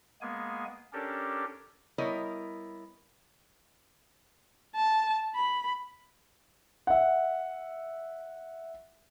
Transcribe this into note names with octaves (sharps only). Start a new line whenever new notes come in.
G#3 A#3 B3 G#5
C#4 D4 G4 A4 A#4
G3 B3 E4 A#4 C#5 D#5
A5
B5
E5 F#5